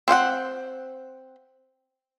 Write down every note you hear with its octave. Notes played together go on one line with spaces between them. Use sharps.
C4 C5 F5 F#5